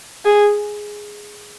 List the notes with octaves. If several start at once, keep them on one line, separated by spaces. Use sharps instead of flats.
G#4